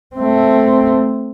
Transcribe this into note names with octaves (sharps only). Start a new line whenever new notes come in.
A3 C4